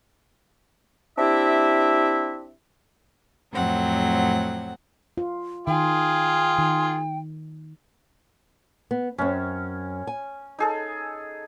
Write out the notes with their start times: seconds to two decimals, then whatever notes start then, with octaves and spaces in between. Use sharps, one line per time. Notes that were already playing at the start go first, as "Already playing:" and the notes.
1.18 C4 D4 E4 G4 E5
3.53 F2 A2 F#3 C4 F#5
5.17 F4
5.67 D#3 F4 G#4 G5
6.59 D#3
8.91 B3
9.18 F#2 C4 C#4
10.07 G#5
10.59 D#4 G#4 A4